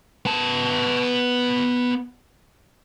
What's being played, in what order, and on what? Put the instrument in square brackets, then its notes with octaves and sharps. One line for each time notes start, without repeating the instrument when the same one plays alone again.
[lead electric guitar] B3 A5